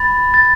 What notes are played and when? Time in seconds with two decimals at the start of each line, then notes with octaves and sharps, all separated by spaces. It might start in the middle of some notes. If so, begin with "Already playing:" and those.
Already playing: B5 A6
0.34 A6